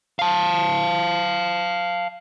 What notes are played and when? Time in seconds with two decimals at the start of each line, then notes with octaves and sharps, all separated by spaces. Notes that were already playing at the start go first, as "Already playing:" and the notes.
0.19 F5 A5